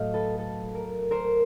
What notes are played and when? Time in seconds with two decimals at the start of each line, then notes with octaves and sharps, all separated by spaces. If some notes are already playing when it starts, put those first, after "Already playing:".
Already playing: A2 F#3 A3 D#5 F5
0.14 A4 B4
0.39 A4
0.75 A#4
1.11 A#4 C5